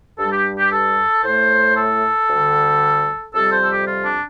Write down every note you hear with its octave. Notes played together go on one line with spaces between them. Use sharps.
G2 G3 A4
G4
G4
A4
A2 A3 C5
A4
D2 D3 G3
F2 C3 G3 A4
C5
A4
G4
F4
D4